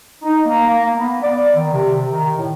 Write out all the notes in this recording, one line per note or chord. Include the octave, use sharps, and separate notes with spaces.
D#4
A#3
A#3
B3
D5
D#3
C3
D#3
A2